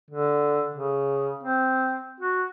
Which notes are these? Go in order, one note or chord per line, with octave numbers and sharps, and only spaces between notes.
D3
C#3
C4
F#4